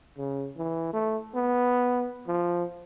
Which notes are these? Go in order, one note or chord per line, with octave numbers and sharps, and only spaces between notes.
C#3
E3
A3
B3
F3